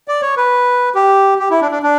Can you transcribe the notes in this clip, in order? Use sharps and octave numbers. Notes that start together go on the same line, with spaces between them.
D5
C#5
B4
G4
G4
E4
D4
D4
D4